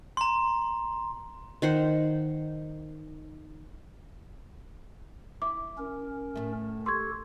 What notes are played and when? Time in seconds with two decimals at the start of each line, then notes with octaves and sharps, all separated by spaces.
0.17 A#5 C6
1.62 D#3 C5 F#5
5.42 E4 D6
5.78 C#4 A#4
6.36 A2 A3
6.86 G4 A4 C6 C#6 G#6